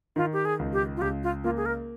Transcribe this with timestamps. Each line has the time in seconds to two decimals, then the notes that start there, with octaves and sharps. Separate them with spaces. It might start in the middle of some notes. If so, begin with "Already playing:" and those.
0.16 D#3 F4
0.33 G4
0.45 G#4
0.59 C#2
0.73 G4
0.97 F4
1.01 C#2 G4
1.23 F4
1.44 A#3 F4
1.57 G#4
1.66 A#4